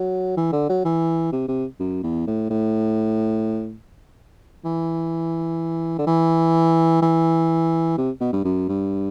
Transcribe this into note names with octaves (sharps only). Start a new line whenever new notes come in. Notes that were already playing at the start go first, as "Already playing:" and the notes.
Already playing: F#3
E3
D3
F#3
E3
C3
C3
F#2
E2
A2
A2
E3
D3
E3
E3
C3
B2
G2
F#2
G2